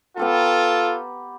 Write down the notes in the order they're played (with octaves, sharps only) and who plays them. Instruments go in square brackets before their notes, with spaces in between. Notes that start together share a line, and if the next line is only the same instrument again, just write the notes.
[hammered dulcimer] B3 G4 A#5 [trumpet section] F4 A4